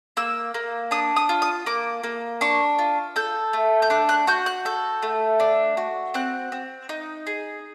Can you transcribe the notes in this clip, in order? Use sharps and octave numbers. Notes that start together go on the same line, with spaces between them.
A#3 E6
A#3
D4 D#6
D#6
F4
D#6
A#3 D6
A#3
D4 C#6
F4
A4 G6
A3
G6
D4 F#6
F#6
F#4 G6
F#6
A4 G6
A3
D4
F#4
C4 F#6
C4
D#4
G#4